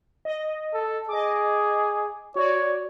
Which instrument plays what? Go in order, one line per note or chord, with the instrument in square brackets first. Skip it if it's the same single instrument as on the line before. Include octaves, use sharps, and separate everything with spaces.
[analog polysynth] D#5
[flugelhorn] A4
[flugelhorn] G#4 [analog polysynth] D#5 D6
[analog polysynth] F#4 D5 [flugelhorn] C#5